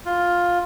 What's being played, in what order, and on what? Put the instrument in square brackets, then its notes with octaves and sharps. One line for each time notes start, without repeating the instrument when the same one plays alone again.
[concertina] F4